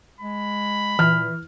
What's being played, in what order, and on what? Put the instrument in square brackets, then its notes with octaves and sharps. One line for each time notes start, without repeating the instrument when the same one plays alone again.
[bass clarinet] G#3 [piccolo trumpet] B5
[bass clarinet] A#2 [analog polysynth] E3 [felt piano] F6